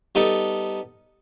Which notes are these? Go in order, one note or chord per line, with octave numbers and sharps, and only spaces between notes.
G3 B3 D#4 A4